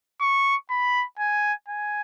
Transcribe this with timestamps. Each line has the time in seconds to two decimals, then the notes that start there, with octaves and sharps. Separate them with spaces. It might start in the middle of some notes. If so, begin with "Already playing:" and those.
0.21 C#6
0.70 B5
1.19 G#5
1.68 G#5